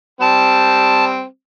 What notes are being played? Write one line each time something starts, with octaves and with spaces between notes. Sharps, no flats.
G3 C4 A5